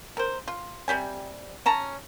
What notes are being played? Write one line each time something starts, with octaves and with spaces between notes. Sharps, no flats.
A#4 C5
F4
C3 G3 G4 G#5
C#4 A5 A#5